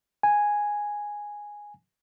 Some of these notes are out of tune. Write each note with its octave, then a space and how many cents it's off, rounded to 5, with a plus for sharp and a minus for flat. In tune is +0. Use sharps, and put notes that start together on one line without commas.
G#5 -5